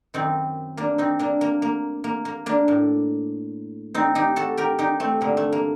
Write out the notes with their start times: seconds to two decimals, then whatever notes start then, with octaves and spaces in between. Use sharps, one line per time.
0.14 F#2 D#3 C4 D#4
0.77 A#3 D4
0.98 C4 D#4
1.19 A#3 D4
1.41 A#3
1.62 A#3
2.04 A#3
2.25 A#3
2.46 A#3 D4
2.68 A2
3.94 C4 D#4
4.15 D#4 G4
4.36 F#4 A4
4.57 G4 A#4
4.79 D#4 G4
5.00 A3 C4
5.21 G2 D3 A#3
5.37 A3
5.52 A#3